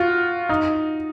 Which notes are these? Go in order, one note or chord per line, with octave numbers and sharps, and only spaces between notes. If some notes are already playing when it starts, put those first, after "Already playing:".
Already playing: F4 F#4
D#4